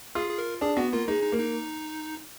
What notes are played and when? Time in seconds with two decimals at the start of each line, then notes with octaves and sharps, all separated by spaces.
0.15 F4 G#4
0.30 G#4
0.38 A#4
0.61 D4 G#4
0.77 B3 F#4
0.92 A#3 F4
1.08 G#3 D#4
1.23 D#4
1.32 A#3
1.40 D#4